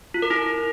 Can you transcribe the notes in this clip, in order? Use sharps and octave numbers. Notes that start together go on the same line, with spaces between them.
F4
A#4
E4